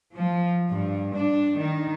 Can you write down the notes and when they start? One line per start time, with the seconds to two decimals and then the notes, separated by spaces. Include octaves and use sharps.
0.14 F3
0.69 G2
1.15 D4
1.58 D#3